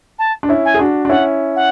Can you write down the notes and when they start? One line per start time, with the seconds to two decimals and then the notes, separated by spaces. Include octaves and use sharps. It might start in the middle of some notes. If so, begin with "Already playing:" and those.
0.19 A5
0.43 D4
0.49 C#4 E4
0.65 G#5
0.74 G#4
0.79 D4 F#4
1.05 D4
1.09 C#4 E4 F#5
1.56 F#5